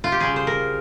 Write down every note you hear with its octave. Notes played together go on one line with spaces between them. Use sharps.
F4
G4
C#3 G3 G#4
C5
A#4